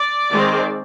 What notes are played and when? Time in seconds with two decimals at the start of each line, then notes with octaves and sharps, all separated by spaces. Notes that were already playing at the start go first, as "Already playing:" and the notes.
Already playing: D5
0.31 D#3 G#3 C4